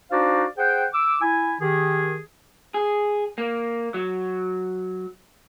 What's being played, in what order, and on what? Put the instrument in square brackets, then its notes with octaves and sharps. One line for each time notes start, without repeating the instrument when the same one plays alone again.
[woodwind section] D4 D#4 F#4 C5 D5 F5
G#4 C5 F#5 G5
D6 E6
E4 G#5
D#3 G4 G#4
[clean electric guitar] G#4
A#3
F#3